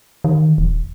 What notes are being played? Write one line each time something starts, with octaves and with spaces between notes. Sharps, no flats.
D#3
D#1